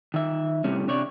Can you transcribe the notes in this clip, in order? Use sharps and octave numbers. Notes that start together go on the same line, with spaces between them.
D#3 E5
A2 C3 G3 C#4
C3 D4 C#5 D5